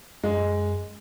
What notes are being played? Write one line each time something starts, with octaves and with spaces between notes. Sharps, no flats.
F#2 G#3